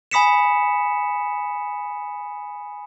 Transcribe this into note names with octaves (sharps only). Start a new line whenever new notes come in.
G#5 B5 D#6 B6 C#7 E7